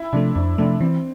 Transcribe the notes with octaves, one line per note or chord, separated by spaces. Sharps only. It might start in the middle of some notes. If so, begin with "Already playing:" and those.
Already playing: E4
C3 F3 A3 D4
F2 D4
C3 F3 A3 D4
E3 C4